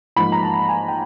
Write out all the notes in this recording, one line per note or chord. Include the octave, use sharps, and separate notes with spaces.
G#2 F3 A#3 B5
A#5
A5
G#5
G5